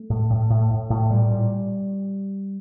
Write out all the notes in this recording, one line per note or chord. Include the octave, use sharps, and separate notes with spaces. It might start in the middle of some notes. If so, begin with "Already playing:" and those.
Already playing: A3
A2
A2
A2
A2
A2
A#2 G3
A#2